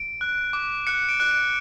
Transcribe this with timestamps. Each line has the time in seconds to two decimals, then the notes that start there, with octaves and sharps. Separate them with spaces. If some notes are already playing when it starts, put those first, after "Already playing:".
Already playing: D7
0.21 F#6
0.53 D6
0.87 F#6 C#7
1.09 D7
1.20 F#6
1.31 D7